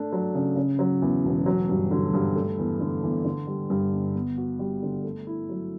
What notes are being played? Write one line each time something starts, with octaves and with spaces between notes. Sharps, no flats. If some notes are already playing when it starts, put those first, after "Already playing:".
Already playing: A3 D4
F#3
C#3
C#3
F#3
E2
E1
F#3
G2
D3
G2
A3
E2
D3
E2
D3
G3
G2
G1
B3
F#4
G3
D3
A3
E4
F#3